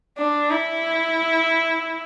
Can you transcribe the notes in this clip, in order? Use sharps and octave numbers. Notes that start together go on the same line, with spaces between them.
D4
E4